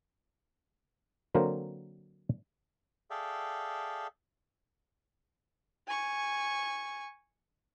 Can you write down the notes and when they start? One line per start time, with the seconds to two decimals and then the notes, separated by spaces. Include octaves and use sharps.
1.35 D3 F#3 A#3 C4 A#4 C5
3.10 G#4 A4 D5 E5 F5 G5
5.87 G#5 C#6